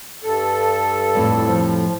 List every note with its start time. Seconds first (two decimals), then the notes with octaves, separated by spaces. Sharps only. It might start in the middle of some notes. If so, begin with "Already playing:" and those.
0.23 G2 A4
1.15 F2 A2 G3
1.44 F3